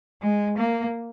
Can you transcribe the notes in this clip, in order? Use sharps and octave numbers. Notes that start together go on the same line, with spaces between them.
G#3
A#3